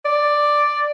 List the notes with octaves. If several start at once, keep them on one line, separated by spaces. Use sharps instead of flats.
D5